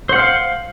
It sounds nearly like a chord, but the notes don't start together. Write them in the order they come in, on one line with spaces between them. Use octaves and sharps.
C5 F#5 F6 F5